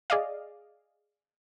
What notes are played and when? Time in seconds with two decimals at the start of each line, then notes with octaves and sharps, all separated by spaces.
0.10 G#4 D5 D#5 F5